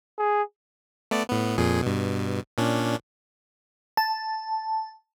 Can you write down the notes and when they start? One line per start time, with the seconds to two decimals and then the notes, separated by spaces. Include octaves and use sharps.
0.18 G#4
1.11 A3 B3 D5
1.29 A2 B3
1.58 F2 A#2 G#4
1.83 G2 B2
2.58 A#2 C#4 D4
3.97 A5